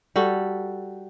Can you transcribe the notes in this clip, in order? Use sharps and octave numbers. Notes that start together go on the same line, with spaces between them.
G3 F#4 A4